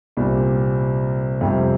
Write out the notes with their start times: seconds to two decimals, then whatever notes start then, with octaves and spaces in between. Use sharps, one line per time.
0.17 C2 A#2 G3 C4
1.41 F2 C3 G3